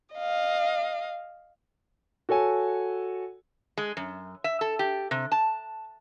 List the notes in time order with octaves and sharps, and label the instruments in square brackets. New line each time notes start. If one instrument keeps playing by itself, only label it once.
[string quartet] D#5 F5
[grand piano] F#4 A4 C#5 G#5
[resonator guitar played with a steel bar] G#3
F#2
E5
A4
G4
C3
A5